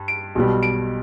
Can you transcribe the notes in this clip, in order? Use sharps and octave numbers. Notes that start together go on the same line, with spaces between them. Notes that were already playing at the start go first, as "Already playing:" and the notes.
Already playing: G2
D7
B1 B2 G3
D7